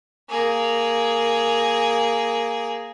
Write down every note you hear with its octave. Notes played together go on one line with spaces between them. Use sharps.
A#3 G#4